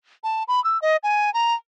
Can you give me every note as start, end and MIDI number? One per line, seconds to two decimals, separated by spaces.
0.24 0.43 81
0.48 0.63 83
0.64 0.80 88
0.82 0.97 75
1.03 1.33 80
1.34 1.54 82